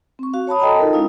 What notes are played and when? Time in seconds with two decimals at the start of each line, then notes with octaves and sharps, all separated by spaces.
0.19 C4 C#6
0.34 F#4 F5
0.47 C#5 A5 B5 D#6
0.60 A4 D#5 G5 A5 A#5
0.79 D#4 F4 A4 A#4
0.93 G#3 C#4 E4 F5 D#6